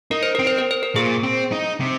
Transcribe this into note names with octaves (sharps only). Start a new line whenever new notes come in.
D#4 A#4
C5
C4 A#4
C5
A#4
C5
A#4
A#2 G#4
C4
D#4
C3